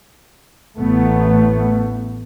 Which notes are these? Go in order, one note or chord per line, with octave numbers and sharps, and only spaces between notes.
A1 A3 B3